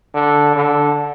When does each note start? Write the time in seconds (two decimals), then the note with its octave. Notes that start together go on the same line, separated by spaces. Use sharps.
0.15 D3
0.56 D3